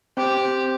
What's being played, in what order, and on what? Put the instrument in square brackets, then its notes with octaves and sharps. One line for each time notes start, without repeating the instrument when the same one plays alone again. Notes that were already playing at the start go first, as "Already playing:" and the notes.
[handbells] C4 C5 [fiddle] G4
[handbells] C4 C5